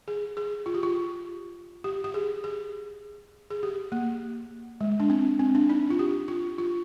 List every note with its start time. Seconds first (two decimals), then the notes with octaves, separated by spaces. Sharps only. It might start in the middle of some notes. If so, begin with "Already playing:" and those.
0.08 G#4
0.37 G#4
0.66 F4
0.74 G4
0.83 F4
1.84 G4
2.04 G4
2.14 G#4
2.44 G#4
3.50 G#4
3.63 G4
3.92 A#3
4.81 G#3
5.00 D4
5.10 C4
5.40 C4
5.55 D4
5.69 D#4
5.90 F4
5.99 G4
6.28 F4
6.58 F4